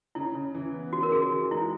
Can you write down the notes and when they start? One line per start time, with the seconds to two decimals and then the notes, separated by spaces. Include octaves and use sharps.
0.15 C#3 E4
0.35 C#3
0.55 E3
0.74 B3
0.93 C#3 F#4
1.03 A#4
1.12 C#4 G#4
1.22 F#4
1.32 E3
1.51 G#3 E4